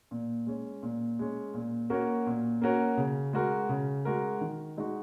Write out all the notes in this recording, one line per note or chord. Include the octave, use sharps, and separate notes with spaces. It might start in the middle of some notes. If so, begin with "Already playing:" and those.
A#2
G#3 C#4
A#2
G#3 C#4
A#2
A#3 C#4 F#4 A#4
A#2
A#3 C#4 F#4 A#4
C#3
G#3 F#4 A#4
C#3
G#3 F#4 A#4
D#3
G#3 D#4 F#4